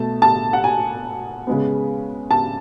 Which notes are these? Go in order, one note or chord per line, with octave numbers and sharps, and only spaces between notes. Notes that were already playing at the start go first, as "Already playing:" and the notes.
Already playing: B2 A3 A5
A5
F#5
G#5
C#3 G#3 B3
A5